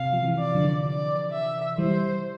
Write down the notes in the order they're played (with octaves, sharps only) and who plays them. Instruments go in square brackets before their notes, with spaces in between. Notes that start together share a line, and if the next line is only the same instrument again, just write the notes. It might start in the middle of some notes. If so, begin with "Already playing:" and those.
Already playing: [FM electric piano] C3 [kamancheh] F5
[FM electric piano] F3
C3 E3
[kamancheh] D5
[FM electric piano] D3 F3
[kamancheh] D5
E5
[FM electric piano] E3 G3 [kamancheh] C5